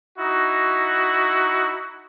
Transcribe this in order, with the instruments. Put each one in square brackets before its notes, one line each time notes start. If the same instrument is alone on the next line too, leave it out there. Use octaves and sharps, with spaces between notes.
[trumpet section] D#4 E4 F#4